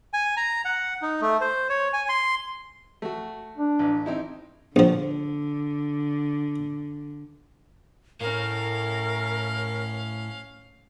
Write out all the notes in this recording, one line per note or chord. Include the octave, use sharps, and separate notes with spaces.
G#5
A#5
F#5
D#4
A3
C5
C#5
G#5
C6
A3 F#4
D4
A1
C4 D#4 E4
A#1 D3 F3
A2 C#4 A#4 F5